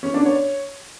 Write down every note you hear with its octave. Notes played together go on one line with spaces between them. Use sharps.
C#4
D4
C#5